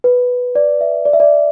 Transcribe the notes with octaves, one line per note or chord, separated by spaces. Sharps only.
B4
D5
E5
D5
E5
D5